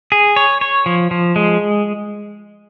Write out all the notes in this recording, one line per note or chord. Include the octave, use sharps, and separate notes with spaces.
G#4
C#5
C#5
F3
F3
G#3